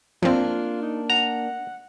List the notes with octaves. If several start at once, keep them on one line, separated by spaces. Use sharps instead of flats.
F3 A#3 C4 D4 F4
D#4
F#5 A#5